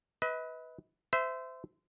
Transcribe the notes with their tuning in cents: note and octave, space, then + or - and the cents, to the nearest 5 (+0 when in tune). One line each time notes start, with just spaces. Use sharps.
B4 +0 D#5 +40
C5 -25 E5 +0